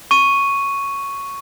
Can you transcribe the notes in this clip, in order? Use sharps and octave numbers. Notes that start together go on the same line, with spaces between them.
C#6 D#7